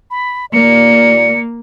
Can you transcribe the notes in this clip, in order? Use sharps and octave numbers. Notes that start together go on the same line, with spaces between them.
B5
D#2 A#2 A#3 D5 C#7